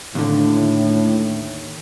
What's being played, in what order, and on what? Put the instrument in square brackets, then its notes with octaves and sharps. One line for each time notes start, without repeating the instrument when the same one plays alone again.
[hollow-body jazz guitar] D#2 D3 [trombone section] A2